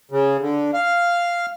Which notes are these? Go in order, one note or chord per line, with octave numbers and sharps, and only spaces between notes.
C#3
D3
F5